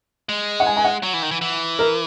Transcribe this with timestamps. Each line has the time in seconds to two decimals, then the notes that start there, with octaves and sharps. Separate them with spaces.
0.29 G#3
0.60 F#5
0.66 G#5
0.77 G#5
0.84 F#5
1.03 F#3
1.13 E3
1.22 D#3
1.31 E3
1.41 E3
1.79 A#4